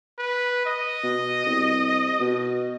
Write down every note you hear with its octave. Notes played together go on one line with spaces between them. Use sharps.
B4
D#5
B2
C2
B2